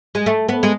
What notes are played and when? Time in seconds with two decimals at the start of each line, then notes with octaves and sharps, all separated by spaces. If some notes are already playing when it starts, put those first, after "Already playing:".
0.15 G#3
0.26 A3
0.49 B3
0.63 G#3